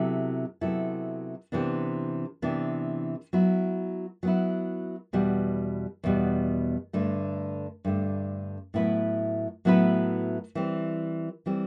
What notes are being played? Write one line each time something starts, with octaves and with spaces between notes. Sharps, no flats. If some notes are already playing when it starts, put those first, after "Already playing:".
Already playing: C3 F#3 B3 E4 A4
C3 F#3 B3 E4 A4
C3 E3 B3 D4
C3 E3 B3 D4
F#3 B3 E4
F#3 B3 E4
E2 B2 G3
E2 B2 G3
G2 D3 A3
G2 D3 A3
A2 F#3 B3 E4 B4
A2 F#3 B3 E4 B4
E3 G3 C4
E3 G3 C4